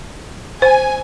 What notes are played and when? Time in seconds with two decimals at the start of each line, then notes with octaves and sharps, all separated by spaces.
0.62 C5 G#5